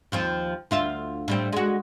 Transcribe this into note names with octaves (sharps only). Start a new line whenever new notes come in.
D#2 F3 C4
D2 F4 E5
A2 G3 C4
G#3 F#4